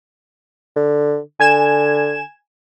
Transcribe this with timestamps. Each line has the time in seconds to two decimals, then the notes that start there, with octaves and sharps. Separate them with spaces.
0.76 D3
1.40 D3 G#5 G#6 E7